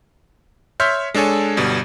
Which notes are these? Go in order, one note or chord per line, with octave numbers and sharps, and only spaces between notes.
C#5 E5 C6 F6 G6 B6
G#3 D4 A4 C#5 G#5
G1 B2 G3